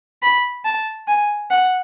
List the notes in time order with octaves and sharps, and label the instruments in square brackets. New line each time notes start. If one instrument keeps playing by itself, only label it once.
[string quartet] B5
A5
G#5
F#5